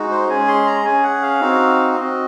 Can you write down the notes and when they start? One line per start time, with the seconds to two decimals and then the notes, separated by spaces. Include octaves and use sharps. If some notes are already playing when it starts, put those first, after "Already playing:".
Already playing: G#3 D#4 F#4
0.11 C5
0.29 G#3 C#4 G#4 G#5
0.48 C6
0.66 A#5
0.85 C#4 G#4 G#5
1.03 F#5
1.22 F5
1.40 C4 D#4 F#4
1.95 C4 F#4 D#5